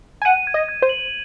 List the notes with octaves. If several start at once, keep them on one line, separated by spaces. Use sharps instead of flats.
G#5
F#5 D#7
G#6
D#5
G#6
C5
F#7